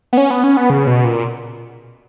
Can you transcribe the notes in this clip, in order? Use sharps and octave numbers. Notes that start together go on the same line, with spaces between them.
B3
C#4
B3
C#4
B3
C#3
B2
A#2